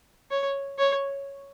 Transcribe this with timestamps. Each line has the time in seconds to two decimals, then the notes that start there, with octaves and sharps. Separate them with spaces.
0.31 C#5
0.78 C#5